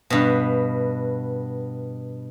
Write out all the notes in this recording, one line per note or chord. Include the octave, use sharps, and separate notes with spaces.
G2 B2